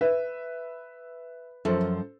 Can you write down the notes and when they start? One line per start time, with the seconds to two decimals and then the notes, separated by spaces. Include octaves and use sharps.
0.01 B4 E5
1.65 F#2 F3 A4 C5